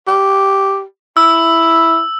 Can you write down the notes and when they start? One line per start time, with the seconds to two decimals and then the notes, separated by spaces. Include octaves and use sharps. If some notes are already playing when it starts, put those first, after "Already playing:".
0.08 G4
1.17 E4 E6